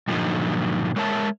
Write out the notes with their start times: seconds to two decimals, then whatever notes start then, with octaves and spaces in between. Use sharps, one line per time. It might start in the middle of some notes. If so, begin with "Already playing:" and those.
0.08 G2 A#2 D3 F3 F#3 D#4
0.96 G#3 A#4 C#5 E5 A5